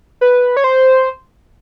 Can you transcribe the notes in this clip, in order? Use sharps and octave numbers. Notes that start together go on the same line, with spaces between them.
B4
C#5
C5